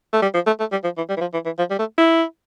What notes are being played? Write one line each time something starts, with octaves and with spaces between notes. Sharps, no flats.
A3
G3
F3
A3
A3
G3
F3
E3
G3
E3
F3
E3
E3
F3
G3
A3
E4